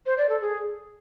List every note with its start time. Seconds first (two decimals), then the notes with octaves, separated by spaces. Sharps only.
0.06 C5
0.18 D5
0.29 A4
0.41 G#4